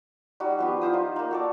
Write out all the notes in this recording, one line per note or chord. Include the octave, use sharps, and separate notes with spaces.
G3 D#4 F#4
F3 B3 G4
E4 F4 C5 D#6
D#4 F4
A#3 D#4
F#4 A4 D5